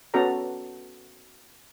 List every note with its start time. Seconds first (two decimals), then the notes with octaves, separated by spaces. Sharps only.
0.14 B3 C#4 F#4 A4 D5 A#5